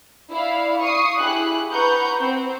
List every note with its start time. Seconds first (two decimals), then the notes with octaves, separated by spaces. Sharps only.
0.31 E4 D5 F5
0.80 C#6 D#6 C7
1.18 E4 G4 G#4 F#6
1.72 B4 F#5 A#5 C#6 G6
2.20 C4